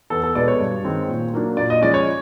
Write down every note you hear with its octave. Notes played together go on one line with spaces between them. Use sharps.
E2 A4
A4
B2 G#3 B3 D5
C#5
G2
D#3 G#3 C4
A#2
F#3 A#3 D4
A#2 D5
D#5
F3 G#3 C#4 D5
C#5